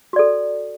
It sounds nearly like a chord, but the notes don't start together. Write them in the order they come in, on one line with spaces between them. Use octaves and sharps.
F#4 D5 A4